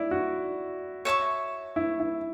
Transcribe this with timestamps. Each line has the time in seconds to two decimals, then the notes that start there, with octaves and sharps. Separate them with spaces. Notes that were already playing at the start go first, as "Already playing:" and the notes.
Already playing: E4 D5
0.11 F#4
1.05 C#5 E5 A5 C#6
1.76 E4
2.00 E4